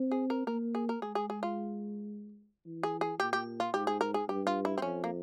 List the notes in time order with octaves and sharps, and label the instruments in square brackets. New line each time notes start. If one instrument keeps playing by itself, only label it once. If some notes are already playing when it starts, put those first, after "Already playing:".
Already playing: [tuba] C4
[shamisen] G#4
A#4
[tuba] A#3 [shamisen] A#4
[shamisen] G#4
A#4
[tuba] G#3 [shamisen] G#4
[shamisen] G#4
G#4
F4
[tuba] E3
[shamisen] G#4
G#4
[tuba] A#2 [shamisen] G4
[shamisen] G4
F4
[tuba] G#2 [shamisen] G4
[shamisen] G#4
A#4
G#4
[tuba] G2 [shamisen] G4
[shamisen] F4
E4
C4
[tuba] F2 [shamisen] C#4
[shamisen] A#3